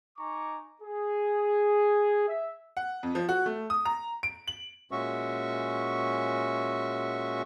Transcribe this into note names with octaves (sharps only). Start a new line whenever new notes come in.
D#4 G#5 A#5 C#6 D6
G#4
E5
F#5
F2
F3
F#4
A3
D#6
A#5
D7
F#7
A#2 G#3 C#4 F#4 E5 C#6